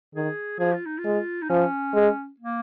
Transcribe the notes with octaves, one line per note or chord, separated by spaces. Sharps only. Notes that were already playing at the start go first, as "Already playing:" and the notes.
D#3 G#4
F3 G#4
F4
D#4
F4
G#3
D#4
F3 C#4
G#3
A#3